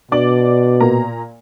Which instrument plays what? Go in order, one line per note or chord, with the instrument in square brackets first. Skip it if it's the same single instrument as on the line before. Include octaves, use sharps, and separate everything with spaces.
[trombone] B2 [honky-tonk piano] D4 D5 F#7
[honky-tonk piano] A#2 A#3 A#5